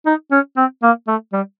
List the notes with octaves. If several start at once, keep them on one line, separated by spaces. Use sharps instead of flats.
D#4
C#4
C4
A#3
A3
G3